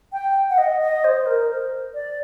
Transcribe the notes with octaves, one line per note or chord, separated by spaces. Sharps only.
G5
F#5
D#5
D#5
C5
A#4
C5
D5